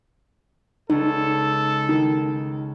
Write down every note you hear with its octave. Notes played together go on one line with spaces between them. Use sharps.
C#2 D#4 A4
D#3